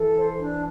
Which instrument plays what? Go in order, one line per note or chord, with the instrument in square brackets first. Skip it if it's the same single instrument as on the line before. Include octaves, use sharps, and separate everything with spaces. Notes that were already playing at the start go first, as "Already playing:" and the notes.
Already playing: [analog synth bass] E3 [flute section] A4
[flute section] C5
D4